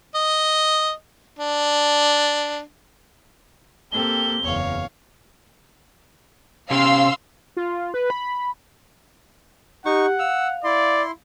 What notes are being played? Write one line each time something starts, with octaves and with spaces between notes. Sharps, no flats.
D#5
D4
A#3 C4 G4 A4 G7
F#1 E2 C#5 F5
C3 C#4 G4 F5 C6 E6
F4
B4
B5
D#4 G4 F#5 C#6
F5 E6
E4 D5 C6